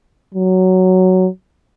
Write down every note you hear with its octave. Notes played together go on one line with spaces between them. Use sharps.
F#3